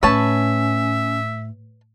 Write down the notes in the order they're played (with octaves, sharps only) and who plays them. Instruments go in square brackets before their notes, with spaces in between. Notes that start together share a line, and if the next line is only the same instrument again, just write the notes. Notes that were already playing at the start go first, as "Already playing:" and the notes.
[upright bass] A2 [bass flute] C#4 [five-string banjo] B4 C#5 A5 [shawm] E5